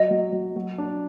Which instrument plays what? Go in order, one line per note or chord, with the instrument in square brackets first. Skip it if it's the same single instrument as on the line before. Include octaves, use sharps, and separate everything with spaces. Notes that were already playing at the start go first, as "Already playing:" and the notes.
Already playing: [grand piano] F#3 [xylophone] D#5
[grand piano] F#3
F#3
F#3
D4